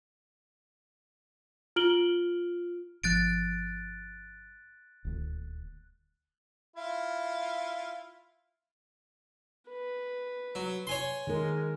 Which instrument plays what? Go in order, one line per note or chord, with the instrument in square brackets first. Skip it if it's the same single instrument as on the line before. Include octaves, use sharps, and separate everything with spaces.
[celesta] F4 F6 D7 F#7 G7
[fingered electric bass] G1 F3 [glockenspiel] F#6 A6 D7
[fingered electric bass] D#1 D2
[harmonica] E4 F4
[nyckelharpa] B4
[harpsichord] F#3
C#5 G#5 C6
[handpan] D#3 A#4 [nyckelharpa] G#3